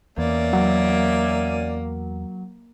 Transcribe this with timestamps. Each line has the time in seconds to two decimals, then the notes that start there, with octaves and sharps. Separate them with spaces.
0.18 E2 A#3 C#4 D5 E5
0.53 F#3